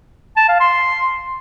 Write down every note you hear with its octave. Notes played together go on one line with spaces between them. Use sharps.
A5
F5
C6